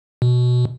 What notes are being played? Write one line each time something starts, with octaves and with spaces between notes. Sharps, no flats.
B2